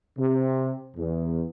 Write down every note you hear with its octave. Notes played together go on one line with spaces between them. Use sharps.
C3
E2